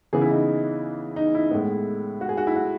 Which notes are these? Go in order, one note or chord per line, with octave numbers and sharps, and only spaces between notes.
C#3 E3 B3 G#4
E4
D#4
D#4
E4
A2 G#3 B3
F#4
G#4
F#4
E4
F#4